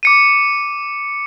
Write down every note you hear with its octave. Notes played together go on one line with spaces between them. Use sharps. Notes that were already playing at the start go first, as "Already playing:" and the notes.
D6 C#7 D#7